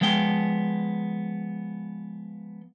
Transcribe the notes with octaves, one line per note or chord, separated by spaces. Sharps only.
F3 G#3 B3 G5